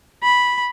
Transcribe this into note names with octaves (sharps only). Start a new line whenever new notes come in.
B5